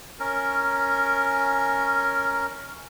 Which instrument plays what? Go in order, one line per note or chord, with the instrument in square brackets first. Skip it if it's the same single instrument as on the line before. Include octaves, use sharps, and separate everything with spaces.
[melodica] C#4 A#4